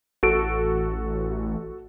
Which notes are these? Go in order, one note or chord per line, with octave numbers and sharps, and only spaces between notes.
A1 F#4 A4 D7